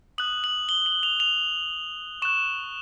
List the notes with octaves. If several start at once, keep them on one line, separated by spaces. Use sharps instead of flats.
D#6 F#6 F#7
F#7
G7
F#7
F7
F7
C#6 F#6 E7